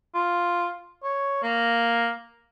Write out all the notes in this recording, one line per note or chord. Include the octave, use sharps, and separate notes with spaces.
F4
C#5
A#3